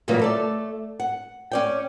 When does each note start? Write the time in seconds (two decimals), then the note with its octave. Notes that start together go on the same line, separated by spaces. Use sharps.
0.08 A#2 C#3 E3 F#3 G3 A#3
0.19 A3 A4 D5
1.00 F#5
1.52 C#4 D5 G5